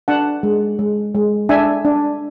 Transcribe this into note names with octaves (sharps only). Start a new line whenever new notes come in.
D4 F#5 A5
G#3
G#3
G#3
D4 E5 G#5
D4